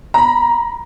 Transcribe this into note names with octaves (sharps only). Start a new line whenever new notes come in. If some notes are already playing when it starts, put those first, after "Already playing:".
A#5 B5